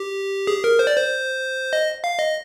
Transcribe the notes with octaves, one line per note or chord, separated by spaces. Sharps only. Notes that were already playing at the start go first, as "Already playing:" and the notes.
Already playing: G4
G#4
A#4
C5
D5
C5
D#5
F5
D#5